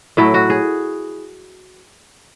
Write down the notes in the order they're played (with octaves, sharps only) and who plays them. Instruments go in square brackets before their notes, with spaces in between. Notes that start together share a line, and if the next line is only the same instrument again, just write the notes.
[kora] A2 F#3 A3 E4
F#4
G#4